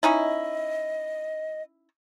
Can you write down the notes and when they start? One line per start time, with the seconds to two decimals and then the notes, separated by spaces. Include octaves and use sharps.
0.03 C#4 D#4 E4 D#5